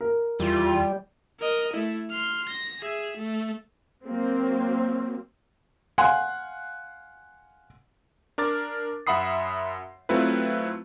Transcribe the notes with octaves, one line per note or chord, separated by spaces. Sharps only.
A#4
E2 G3 F4
A#4 D#5
A3 E4
C6 F6
A#6
G#4 E5
A3
F#3 A#3 C4
F5 F#5 G#5 C6 F#6
D4 A#4 D6 A6
F#2 E5 F#5 B5 D#6 C7
F#3 A3 C4 E4 F4 B4